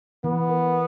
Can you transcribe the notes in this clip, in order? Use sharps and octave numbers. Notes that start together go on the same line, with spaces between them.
E3 B3
A#4